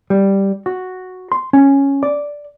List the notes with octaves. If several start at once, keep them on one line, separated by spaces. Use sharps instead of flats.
G3
F#4
C6
C#4
D5